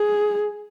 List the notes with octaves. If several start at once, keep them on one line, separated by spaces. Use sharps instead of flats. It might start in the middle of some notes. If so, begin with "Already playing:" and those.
Already playing: G#4